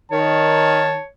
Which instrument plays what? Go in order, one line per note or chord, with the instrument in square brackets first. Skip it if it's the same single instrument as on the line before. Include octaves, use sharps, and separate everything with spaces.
[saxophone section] D#3 [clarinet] C#5 [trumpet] A5